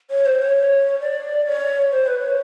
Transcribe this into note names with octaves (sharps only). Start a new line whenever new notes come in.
C#5
C5
C#5
D5
C#5
C5
B4
C#5